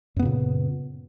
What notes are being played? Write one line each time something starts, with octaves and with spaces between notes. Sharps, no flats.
F#2 A#2 C#3 B3